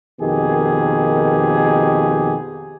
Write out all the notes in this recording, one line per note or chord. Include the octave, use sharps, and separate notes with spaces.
F2 B2 D#3 A#3 G4 G#4